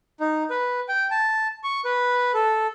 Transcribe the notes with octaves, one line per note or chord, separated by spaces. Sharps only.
D#4
B4
G5
A5
C#6
B4
A4